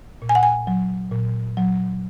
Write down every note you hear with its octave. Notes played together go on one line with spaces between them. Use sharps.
A#2
G#5
F#5
G#5
F#3
A#2
F#3